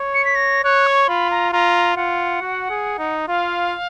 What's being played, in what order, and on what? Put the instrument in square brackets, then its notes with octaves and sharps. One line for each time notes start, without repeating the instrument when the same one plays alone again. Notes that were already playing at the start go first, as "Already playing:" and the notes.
Already playing: [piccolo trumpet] C#5
[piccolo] C#7
B6
A#6
[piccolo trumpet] C#5 [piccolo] F#6
[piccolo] C#6
[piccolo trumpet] F4 [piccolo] B5
[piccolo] A#5
[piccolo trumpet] F4 [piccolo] A#5
[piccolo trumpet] F4 [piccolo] F#5
[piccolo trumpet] F#4
G#4
D#4
[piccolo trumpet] F4 [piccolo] F5